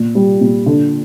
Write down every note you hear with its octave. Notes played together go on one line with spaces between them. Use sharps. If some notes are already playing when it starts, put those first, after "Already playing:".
Already playing: A#2
G3
A#2
D3